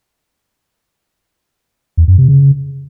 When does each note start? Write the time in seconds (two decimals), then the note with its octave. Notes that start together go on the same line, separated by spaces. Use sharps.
1.97 E2
2.08 F#2
2.18 C3
2.28 C#3